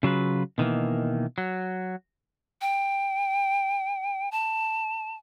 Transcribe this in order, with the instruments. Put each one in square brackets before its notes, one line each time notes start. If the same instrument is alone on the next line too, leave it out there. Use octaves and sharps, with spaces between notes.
[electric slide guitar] C#3 F#3 F4 B4
B2 D#3 E3 A#3
F#3
[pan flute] G5
A5